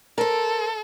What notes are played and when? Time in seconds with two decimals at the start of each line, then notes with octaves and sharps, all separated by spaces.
0.18 A4 A#4 C5